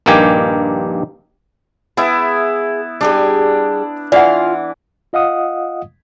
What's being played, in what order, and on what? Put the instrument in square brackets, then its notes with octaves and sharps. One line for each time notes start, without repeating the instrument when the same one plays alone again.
[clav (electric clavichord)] A#1 G2 D#3 A#3 G4 G#5
[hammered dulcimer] B3 E4 [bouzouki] G#4 E5
[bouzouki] G3 G4 G#4 [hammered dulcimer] D4
[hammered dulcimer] E3 [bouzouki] F4 F5 [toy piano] D5 F#5
[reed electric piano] F4 D#5 F5 F#5 D#6